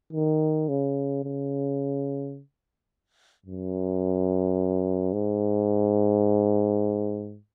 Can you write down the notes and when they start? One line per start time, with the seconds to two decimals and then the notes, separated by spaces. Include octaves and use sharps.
0.13 D#3
0.69 C#3
1.24 C#3
3.46 F#2
5.13 G#2